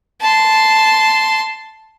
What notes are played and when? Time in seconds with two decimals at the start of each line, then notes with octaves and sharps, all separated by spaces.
0.21 A5 C6